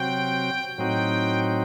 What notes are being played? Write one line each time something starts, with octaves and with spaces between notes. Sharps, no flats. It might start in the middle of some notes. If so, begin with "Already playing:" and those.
Already playing: C3 F#3 C4 F#4 G5
A2 F#3 C4 D#4 F#4 G5